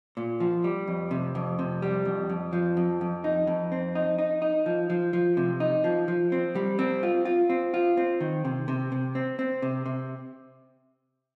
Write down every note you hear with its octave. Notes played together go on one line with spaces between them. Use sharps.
A#2
F3
G3
F2
C3
F2
C3
G3
F2
F2
F3
F2
F2
D#4
F2
C4
D#4
D#4
D#4
F3
F3
F3
C3
D#4
F3
F3
C4
G3
C4
F4
F4
C4
F4
C4
D#3
C3
C3
C3
C4
C4
C3
C3